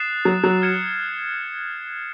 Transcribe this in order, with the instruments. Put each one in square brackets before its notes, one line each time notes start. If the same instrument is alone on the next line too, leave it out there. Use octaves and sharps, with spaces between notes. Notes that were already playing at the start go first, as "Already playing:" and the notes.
Already playing: [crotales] D#6 F#6 A6 C7 E7
[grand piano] F#3
F#3
[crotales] F6 G#6 C#7 E7